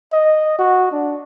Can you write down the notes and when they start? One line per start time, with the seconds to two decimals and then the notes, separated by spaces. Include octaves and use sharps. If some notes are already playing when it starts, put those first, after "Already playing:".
0.13 D#5
0.59 F#4
0.92 D4